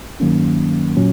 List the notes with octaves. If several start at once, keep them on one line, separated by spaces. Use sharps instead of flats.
G2 D#3 F#3 A#3 C#4
A#2 F#3 C#4